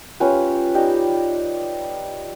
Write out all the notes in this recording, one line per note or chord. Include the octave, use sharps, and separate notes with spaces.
C#4 F4 G4 B4
D#4 G4 D5 D#5